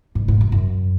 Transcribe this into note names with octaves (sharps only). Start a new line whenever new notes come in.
G#2
G#2
F#2
F#2